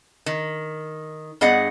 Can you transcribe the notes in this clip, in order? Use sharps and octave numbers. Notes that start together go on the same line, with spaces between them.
D#3
G2 B3 G#4 D#5 F#5